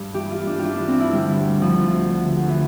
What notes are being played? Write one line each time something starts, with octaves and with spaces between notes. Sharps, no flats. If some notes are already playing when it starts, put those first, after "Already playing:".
Already playing: G2
E3 G4
F4
G2
D4
E3 F4 G4
D4
G2 C4
E4
D3 G3
D2
D3 F3
D2
D3
D2
E3